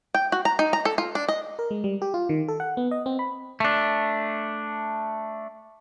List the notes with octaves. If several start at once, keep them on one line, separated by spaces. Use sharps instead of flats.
G5
F#4
A#5
D#4
A#5
A4
F4
D4
D#5
A#4
G#3
G3
G4
F4
D#3
A4
F#5
B3
D#5
C4
B5
A3 D4